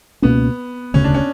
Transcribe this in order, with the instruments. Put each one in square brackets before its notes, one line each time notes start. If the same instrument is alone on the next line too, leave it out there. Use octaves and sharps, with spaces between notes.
[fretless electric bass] C#2 B2 A#3 C#4 [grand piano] B3
[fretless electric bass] E1 D2 C#3 [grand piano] C#4
[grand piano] D4
C#4